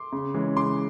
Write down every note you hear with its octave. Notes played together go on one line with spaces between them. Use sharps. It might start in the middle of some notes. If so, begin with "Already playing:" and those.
Already playing: C6 D6
C#3
E3 G#3 C#4
C#3 C6 D6